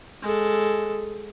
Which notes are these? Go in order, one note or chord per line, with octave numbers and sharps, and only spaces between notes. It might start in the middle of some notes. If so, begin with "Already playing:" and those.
G#3 A4